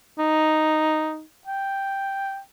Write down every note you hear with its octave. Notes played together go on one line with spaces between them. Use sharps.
D#4
G5